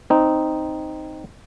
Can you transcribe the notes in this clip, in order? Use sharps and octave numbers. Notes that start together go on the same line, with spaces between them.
C4 D#4